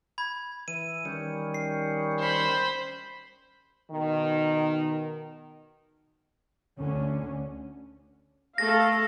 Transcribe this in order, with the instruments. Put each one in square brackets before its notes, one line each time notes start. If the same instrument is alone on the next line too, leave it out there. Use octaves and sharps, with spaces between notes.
[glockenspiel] B5 G#6
[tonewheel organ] E3 [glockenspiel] D#7
[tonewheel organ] D#3 G3 C#4
[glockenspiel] C7
[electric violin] C5 B5
[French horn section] B2 D#3
[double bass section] D2 D3 C#4
[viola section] A3 A4 F5 [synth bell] A#6